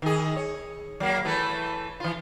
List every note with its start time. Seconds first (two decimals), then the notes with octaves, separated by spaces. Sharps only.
0.02 D#3 G#4
0.36 C#5
1.00 F#3 A#3
1.25 E3 A3 B4
2.00 E3 F4